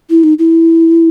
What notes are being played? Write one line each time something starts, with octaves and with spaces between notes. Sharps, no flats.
E4
D#4
E4